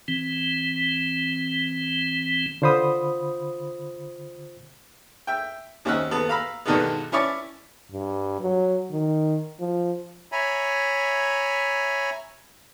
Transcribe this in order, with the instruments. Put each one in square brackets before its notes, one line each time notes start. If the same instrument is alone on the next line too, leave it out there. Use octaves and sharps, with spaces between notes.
[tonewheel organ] E3 C4
[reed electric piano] D3 F4 C5 B5 D#6
[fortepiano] E5 G5
D#2 C4 C#4 D#5 F#5 E6
D#2 B3 A4
F5 A#5 B5 E6
G2 B2 D3 D#3 G#3 B3
C#4 E4 C#5 D5 A5
[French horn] G2
F#3
D#3
F3
[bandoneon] C#5 E5 G#5 A#5 B5